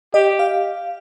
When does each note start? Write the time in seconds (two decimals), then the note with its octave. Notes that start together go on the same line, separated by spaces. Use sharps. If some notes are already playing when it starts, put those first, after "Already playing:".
0.14 G4 D#5
0.39 F5